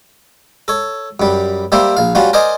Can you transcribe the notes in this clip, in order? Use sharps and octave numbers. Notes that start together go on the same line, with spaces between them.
A4 C#5
F#2 G3
G3 A#3 C5 E5
A#1 F5
G3 C#4 F4 F#4
A#4 C5 D5 D#5 G#5